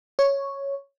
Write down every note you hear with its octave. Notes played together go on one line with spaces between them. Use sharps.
C#5